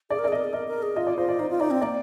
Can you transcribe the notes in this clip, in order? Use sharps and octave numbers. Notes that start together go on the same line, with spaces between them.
G#4 D5
A#4
D5
G#4
A#4 D#5
G#4
A#4 D#5
A#4
G#4
F4 D#5
D5
F4 C5
D5
D#4 C5
F4
D#4 D5
C4
A#3 D5